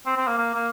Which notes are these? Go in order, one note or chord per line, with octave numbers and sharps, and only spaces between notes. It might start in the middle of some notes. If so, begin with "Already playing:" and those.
C4
C4
A#3
A#3
A#3